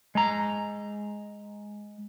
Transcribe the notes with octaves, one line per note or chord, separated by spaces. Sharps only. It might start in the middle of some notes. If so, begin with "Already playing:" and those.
G#3 A#5